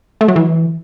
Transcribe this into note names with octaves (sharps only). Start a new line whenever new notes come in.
A3
F#3
E3